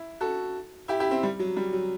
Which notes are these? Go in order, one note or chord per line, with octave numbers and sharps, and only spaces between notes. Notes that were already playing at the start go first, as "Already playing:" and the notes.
Already playing: E4
F#4 A4
E4 G4
E4 G4
C4 E4
G3
F#3
G3
F#3